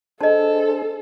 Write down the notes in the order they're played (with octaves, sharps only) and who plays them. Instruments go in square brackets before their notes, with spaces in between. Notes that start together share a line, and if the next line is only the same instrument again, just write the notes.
[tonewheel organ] D4 G#4 C5 [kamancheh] A4 [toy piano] D#5 A5